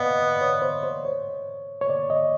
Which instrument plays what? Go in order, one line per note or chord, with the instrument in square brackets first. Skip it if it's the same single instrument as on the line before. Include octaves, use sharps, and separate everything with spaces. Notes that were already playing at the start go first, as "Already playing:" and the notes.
Already playing: [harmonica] B3 [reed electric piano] D5 D#5 F5
[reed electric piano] D#5
D5
C#5
C5
C5
C#5
C#5
D5
D#5